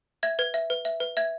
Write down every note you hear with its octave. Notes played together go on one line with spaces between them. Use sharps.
E5 G#6
B4 G#6
E5
B4
E5
B4
E5 G#6